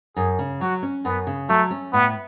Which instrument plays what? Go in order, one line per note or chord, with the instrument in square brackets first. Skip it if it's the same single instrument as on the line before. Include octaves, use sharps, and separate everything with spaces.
[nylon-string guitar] F#2 [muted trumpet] G#4
[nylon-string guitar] C#3
[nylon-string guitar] F#3 [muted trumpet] F#4
[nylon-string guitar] C#4
[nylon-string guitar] F#2 [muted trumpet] B3
[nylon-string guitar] C#3
[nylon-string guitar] F#3 [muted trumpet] A3
[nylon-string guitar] C#4
[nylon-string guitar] A2 [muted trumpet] B3